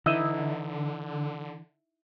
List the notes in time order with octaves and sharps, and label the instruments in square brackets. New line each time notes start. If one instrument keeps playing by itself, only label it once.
[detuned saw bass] D3 [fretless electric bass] E3 [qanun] D#4 E4 [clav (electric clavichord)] D#5 E5